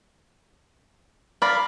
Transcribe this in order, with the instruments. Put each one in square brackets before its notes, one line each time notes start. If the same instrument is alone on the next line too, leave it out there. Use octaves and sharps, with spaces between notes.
[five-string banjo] A#4 D5 F5 [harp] B5 A6